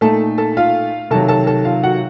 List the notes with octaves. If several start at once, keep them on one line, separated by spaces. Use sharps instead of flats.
A#2 A3 D#4 A4 A5
A4 A5
F4 F5
C3 D#3 F#3 A4 A5
A4 A5
A4 A5
F4 F5
F#4 F#5